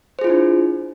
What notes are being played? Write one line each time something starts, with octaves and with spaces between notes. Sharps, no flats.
D4 E4 F4 G#4 C5